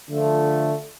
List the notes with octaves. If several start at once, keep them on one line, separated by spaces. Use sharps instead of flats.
D3 F3 A3